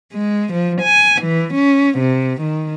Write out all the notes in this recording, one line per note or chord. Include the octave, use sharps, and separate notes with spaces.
G#3
F3
G#5
E3
C#4
C3
D#3